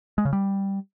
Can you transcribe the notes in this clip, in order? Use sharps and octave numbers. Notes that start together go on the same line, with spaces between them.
G#3
C#3
G3